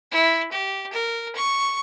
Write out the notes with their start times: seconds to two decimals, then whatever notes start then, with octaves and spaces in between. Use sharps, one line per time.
0.12 E4
0.52 G4
0.93 A#4
1.35 C#6